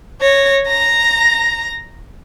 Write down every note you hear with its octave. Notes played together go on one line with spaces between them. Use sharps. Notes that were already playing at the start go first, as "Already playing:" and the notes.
C#5 A#6
A#5 A#6